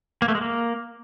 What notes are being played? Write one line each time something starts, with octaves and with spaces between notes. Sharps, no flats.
A#3
A3
G#3
A#3